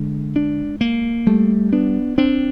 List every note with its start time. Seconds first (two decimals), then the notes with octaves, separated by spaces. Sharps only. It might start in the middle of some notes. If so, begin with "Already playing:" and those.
Already playing: D3 G#3
0.36 D4
0.81 A#3
1.27 G3 A3
1.73 B3 D4
2.18 C4 D4